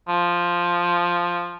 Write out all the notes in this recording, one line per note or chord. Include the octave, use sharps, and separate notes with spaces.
F3